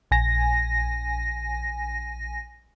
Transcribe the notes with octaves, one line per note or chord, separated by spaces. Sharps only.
A#1 G#5 A#6